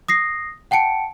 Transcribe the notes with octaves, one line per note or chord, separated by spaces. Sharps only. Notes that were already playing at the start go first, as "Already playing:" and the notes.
D#6 A#6 C7
F#5 G5 A5 C#7 D7